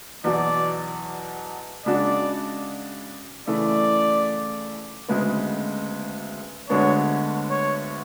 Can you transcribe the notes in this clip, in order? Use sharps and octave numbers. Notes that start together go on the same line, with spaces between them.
E2 B2 F#3 D5
C#3 G#3 D4 F#4 D5
C#3 E3 A3 D5
D2 C#3 G#3 B3
D2 D3 G#3 B3 D4 C#5
C#5